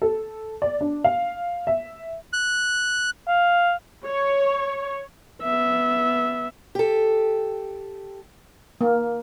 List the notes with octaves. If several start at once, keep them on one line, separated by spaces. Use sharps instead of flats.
A4
D5
D4
F5
E5
F#6
F5
C#5
B3 E5
G4 A4
A#3